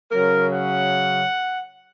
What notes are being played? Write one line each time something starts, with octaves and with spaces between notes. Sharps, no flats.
C#3 F#3 C#4 A#4
F#5